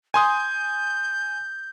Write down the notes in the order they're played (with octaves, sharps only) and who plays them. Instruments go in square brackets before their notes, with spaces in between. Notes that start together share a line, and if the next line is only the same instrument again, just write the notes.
[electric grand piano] G#5 C6 D#6 [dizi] G6